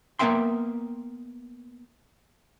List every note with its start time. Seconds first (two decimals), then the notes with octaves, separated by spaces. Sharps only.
0.19 A#3 B3 A#4 E5 G5 C6